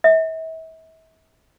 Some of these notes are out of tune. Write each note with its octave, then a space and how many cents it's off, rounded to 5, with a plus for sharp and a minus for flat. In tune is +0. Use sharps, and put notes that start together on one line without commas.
E5 -40